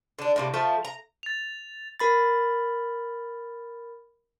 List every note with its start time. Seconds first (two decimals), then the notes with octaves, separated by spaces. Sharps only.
0.19 D3 D4
0.36 A2 C3 A#3
0.54 F3 A3 E5 A5
0.85 A#5
1.23 A6 F7
1.99 A#4 B5 A6